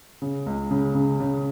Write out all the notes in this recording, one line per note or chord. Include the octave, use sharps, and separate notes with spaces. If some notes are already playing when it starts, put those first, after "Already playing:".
C#3
C#2
C#3
C#3
C#3